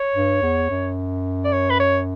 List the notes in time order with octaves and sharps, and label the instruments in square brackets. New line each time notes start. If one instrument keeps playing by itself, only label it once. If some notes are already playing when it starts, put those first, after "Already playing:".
Already playing: [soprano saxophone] C#5
[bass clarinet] G2
E2
F#2
[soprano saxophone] D5
C#5
B4
C#5